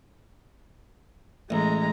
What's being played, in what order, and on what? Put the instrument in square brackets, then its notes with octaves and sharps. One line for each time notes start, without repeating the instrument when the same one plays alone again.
[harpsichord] A1 [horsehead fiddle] G#3 A#5